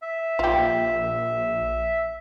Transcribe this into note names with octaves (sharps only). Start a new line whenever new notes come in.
E5
A#1 F4 G4